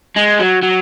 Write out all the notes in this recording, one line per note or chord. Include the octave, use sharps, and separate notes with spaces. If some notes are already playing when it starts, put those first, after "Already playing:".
G#3
F#3
F#3